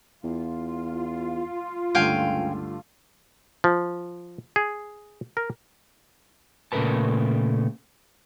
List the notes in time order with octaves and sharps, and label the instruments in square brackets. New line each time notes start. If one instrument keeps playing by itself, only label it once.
[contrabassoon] E2 [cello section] F4
[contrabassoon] C#2 [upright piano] G2 D3 A3 [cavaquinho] F5 G5 G#5
[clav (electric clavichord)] F3
G#4
A#4
[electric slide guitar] A#2 C#3 A3 A#4 B4 A5